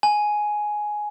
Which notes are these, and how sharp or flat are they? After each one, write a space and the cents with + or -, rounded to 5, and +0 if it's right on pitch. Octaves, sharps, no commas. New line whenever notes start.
G#5 +10